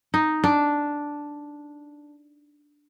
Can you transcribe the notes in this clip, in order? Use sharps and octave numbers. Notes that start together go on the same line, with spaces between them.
D#4
D4